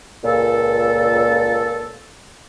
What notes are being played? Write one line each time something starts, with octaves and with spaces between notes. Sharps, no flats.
C#2 A#2 A4